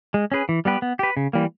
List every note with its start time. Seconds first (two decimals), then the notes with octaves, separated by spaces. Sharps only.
0.14 G#3
0.32 C#4 G#4 B4
0.49 E3
0.65 G3 B3 G4 B4
0.82 B3
0.99 G4 B4
1.17 C#3
1.33 E3 G3 A#3